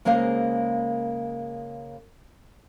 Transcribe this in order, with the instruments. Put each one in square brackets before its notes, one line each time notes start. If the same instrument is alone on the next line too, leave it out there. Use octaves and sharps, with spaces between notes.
[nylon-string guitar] C#3 G#3 A#3 A#4 C5 F5